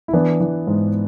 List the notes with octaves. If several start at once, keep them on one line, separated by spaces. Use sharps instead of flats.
E4
E3 B3 D4
E3
G#2